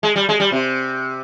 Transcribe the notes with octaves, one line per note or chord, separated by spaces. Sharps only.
G#3
G3
G#3
G3
C3